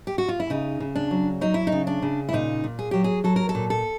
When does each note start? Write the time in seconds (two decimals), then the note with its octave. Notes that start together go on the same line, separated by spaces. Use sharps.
0.07 G4
0.18 F#4
0.29 F4
0.40 E4
0.50 C#3 D#4
0.80 C#3
0.96 D4
1.11 F#3
1.41 F#3 D#4
1.54 E4
1.67 D#4
1.72 C#3
1.87 D4
2.02 C#3
2.29 E4
2.33 A#2 D#4
2.64 A#2
2.79 G#4
2.91 F#3 G4
3.04 G#4
3.24 F#3 A4
3.36 A#4
3.49 A4
3.55 A#2
3.70 A4